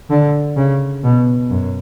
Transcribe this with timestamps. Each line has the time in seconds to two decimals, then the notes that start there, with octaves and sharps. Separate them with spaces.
0.10 D3
0.57 C#3
1.04 B2
1.50 F#2